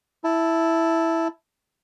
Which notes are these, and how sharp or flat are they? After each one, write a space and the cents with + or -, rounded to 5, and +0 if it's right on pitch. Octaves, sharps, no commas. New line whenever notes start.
E4 +0 A5 +0